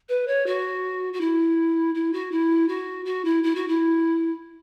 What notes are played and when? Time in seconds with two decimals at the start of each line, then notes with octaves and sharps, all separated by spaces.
0.09 B4
0.27 C#5
0.46 F#4
1.13 F#4
1.21 E4
1.95 E4
2.13 F#4
2.31 E4
2.68 F#4
3.05 F#4
3.25 E4
3.43 E4
3.55 F#4
3.68 E4